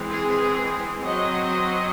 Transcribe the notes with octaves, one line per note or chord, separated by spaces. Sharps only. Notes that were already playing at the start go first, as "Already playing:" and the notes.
Already playing: E3 G#3 C4
G#4
F#3 C4 D#5